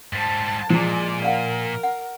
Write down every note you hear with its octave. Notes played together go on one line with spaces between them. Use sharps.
G#2 G3 C5 A5
A#2 F3 G#3 E4 C5 D5
A#4 D5 F5 F#5
F#5